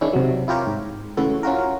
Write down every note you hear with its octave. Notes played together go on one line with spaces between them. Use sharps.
D#3 G#3 C#4 D4 E4
C3 F#3
E4 F4 G4 A#4 C#5
G#2
C#3 E3 A3 E4 F#4 A4
C#4 F4 F#4 A#4